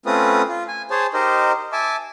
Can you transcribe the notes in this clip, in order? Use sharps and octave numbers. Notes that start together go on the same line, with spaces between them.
A3 C4 C#4 F4 B4 D#6
F4
G#5
G#4 C5 C#5 A5
D#4 G4 A#4 C5 D#5
E5 G#5 A5 D6